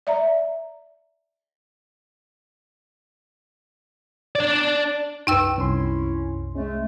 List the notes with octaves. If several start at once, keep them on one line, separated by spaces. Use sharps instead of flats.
D5 E5 A#5
D4 D5
C2 F#2 D#4 B4 G5 E6
C2 C#4 E4 C6
G#3 A3 C#4